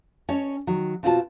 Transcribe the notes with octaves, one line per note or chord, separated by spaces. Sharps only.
C#4 C#5 D#5 A5
D#3 F#3
B2 C4 F4 F#4 A#4 A5